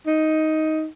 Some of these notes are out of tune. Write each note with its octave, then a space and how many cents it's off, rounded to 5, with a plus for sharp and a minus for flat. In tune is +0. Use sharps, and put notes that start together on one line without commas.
D#4 +10